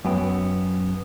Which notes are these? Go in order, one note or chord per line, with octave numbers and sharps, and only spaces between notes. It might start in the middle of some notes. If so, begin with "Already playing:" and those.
F#2 B3 G5